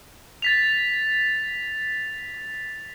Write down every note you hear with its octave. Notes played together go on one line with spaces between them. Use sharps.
A6 B6 F7